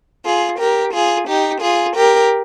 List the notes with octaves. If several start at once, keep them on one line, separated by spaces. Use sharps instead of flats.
F4 G#4
G4 A#4
F4 G#4
D#4 G4
F4 G#4
G4 A#4